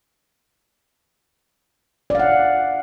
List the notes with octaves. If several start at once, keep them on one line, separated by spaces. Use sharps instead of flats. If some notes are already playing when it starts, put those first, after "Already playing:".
D5 F5 F#5